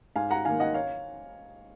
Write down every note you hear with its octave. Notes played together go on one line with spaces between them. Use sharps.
G#2 F5 G#5
F#5 A#5
D#3 A#3 F5 G#5
D#5 F#5
C#5 F5